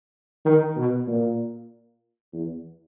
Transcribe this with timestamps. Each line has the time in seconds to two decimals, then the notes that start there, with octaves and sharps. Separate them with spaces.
0.45 D#3
0.76 B2
1.07 A#2
2.33 E2